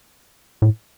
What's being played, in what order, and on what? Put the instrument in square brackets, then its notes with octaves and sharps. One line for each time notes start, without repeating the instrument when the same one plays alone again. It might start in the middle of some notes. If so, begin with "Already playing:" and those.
[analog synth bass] A2